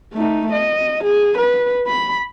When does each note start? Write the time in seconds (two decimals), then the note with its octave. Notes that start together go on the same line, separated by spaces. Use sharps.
0.13 A3 D#4
0.52 D#5
1.04 G#4
1.38 B4
1.87 B5